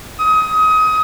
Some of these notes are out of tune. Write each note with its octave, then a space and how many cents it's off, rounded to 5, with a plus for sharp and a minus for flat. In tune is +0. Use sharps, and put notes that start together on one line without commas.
D#6 +25